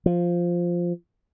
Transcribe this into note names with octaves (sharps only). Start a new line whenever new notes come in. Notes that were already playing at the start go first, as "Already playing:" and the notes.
F3